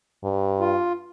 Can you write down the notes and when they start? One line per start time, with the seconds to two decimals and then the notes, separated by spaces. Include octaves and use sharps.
0.24 G2
0.60 F4